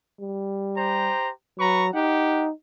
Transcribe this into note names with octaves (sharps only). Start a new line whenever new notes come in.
G3
G4 C5 A#5
F#3 B4 A#5 C#6
D#4 G4 F#5